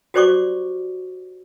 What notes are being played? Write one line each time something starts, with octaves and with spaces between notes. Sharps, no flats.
F#4 G4 C5 D5 C#6 D6